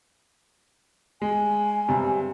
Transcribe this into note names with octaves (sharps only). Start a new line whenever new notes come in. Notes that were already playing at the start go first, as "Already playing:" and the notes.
G#3 G#5
G2 C3